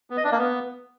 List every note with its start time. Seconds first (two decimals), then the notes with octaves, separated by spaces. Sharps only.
0.10 B3
0.17 D#5
0.24 D4
0.31 A#3
0.38 B3